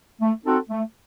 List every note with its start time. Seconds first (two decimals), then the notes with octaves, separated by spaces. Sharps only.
0.21 A3
0.46 C4 D#4 F#4 A4
0.70 A3